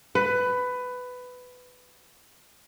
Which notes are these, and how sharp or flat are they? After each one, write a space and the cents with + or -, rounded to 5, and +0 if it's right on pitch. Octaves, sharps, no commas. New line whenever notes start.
B4 +15